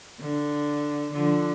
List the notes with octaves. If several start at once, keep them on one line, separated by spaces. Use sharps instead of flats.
D3
D3 F3